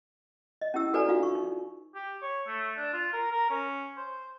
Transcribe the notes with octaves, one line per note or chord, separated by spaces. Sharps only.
D#5
C#4 E4 G4 E6
F#4 A4 B4 D5 G#5 A#5
D4 F4 F#4 F5
C#6
D#4
G4
C#5
A3
D4
F4
A#4
A#4
C#4
C5